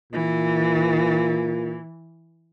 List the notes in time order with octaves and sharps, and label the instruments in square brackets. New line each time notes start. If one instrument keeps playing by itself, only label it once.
[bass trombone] A#2 [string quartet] E3